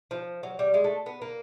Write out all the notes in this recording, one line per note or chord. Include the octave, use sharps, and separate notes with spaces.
F3
F#3
G3
G#3
A3
B3
A#3